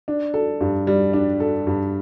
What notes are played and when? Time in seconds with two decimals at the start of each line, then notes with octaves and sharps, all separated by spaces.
0.08 D4
0.34 A4
0.61 G2
0.87 G3
1.13 D4
1.40 A4
1.67 G2